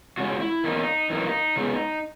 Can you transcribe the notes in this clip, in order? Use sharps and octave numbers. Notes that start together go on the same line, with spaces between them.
C#3 G#3 C#4 F#4
E4
E2 D#3 A#3 C#4 D#4
F#2 E3 A#3 D#4
C#3 G#3 B3